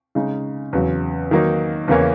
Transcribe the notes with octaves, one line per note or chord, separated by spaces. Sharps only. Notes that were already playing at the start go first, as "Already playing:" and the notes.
C#3 G#3 D#4
E2 C#3 F#3
D#3 F#3 A#3 D#4
E2 C#3 E3 A#3 C#4